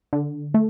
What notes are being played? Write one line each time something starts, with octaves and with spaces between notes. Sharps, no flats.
D3
A3